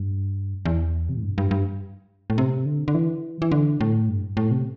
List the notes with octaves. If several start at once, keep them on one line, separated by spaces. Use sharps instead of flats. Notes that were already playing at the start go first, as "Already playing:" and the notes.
Already playing: G2
E2
C3
A2
G2
G2
G2
A2
C3
D3
D3
E3
E3
D3
A2
G2
A2
C3